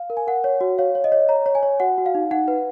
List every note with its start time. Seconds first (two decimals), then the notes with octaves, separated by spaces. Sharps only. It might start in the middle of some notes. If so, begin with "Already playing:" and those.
Already playing: F5
0.10 A#4
0.17 G#5
0.27 A#4 F#5
0.44 C#5
0.61 F#4
0.78 C#5 F5
0.95 C#5
1.04 D#5
1.12 C#5
1.29 C#5 A#5
1.46 C#5
1.55 G#5
1.63 C#5
1.80 F#4 F#5
1.98 F#4
2.06 F5
2.15 D#4
2.31 D#4 F#5
2.48 B4